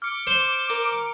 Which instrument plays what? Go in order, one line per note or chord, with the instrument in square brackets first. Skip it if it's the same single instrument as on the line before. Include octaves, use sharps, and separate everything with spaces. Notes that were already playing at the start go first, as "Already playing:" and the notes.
[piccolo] D6 [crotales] F6 C#7
[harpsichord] C5
[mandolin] A#4